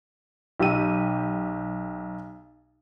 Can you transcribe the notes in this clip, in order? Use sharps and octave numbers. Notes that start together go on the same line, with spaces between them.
B1 G4 E6 D#7